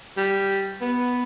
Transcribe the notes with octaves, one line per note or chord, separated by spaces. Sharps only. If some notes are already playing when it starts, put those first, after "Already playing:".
G3
B3